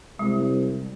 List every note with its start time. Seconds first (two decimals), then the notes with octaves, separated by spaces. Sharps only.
0.19 C2 G#3